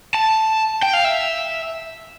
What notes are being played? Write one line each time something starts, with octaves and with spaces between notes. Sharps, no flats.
A5
G5
F5
E5